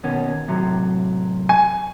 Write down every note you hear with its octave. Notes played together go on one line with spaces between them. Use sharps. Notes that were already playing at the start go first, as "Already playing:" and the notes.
D#2 B2 C#4
A2 C3 F#3
G#5